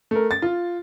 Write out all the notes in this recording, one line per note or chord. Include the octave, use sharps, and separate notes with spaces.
A3 A#4
A6
F4